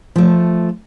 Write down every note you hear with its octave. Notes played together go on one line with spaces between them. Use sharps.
F3 A3